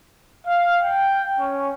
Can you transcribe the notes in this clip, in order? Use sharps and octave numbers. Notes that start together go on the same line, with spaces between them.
F5
G5
C#4